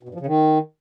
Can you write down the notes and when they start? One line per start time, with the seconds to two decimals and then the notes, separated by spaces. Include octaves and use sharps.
0.03 B2
0.09 G2
0.15 F3
0.20 C#3
0.26 D#3